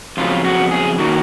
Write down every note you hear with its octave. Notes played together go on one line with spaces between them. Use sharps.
F2 C#3 F#3 B3 F4
F#4
G#4
D#3 F#3 A#3 F#4